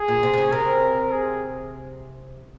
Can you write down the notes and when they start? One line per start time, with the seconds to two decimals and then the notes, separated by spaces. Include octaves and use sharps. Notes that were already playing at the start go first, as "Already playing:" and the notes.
Already playing: G#4
0.08 A#2
0.23 C3
0.33 C3
0.38 C#3
0.52 C3 A#4
1.12 G#4